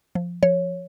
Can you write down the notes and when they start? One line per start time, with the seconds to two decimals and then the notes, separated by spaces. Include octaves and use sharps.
0.15 F3
0.43 F3 C#5